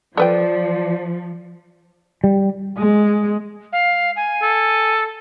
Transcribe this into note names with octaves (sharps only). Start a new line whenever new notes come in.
F3 A4 B4 D5 G5
G3
G#3
F5
G#5
A4